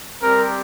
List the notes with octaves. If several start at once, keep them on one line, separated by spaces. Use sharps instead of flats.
G3 C4 G4 A#4